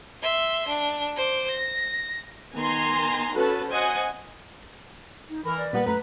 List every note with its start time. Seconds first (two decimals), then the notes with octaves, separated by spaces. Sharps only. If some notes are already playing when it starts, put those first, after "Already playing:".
0.22 E5 C6
0.68 D4
1.16 C5 D6
1.50 A#6
2.53 D#3 B3 G#5 A#5 C6
3.35 C#4 F#4 A4 B4 A5
3.69 C5 D#5 F#5 G#5
5.30 D#4
5.45 E3 A#4 B5
5.58 D5
5.73 A#2 G3 A#3 B3 B4
5.86 F#2 A3 B4 A#5